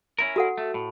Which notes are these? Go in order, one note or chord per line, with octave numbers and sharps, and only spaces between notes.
C#4 E4 A#4
F#4 A4 F#5
A3
A2